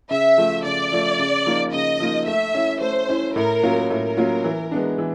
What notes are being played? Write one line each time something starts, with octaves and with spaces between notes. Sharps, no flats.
C#3 E5
F3 A3
C#3 D5
F3 A3
C#3
F3 A#3 D#4
C#3 D#5
F3 A#3 D#4
A3 E5
C#4 E4
A3 C5
C#4 E4
A2 A#4
F#3 A#3 C#4 F4
A2 A#4
F#3 A#3 C#4 F4
E3
G#3 B3 D4
E3